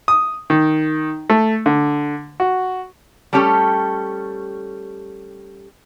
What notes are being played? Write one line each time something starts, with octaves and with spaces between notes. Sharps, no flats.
D#6
D#3
A3
D3
F#4
G3 A3 C#4 G4 A4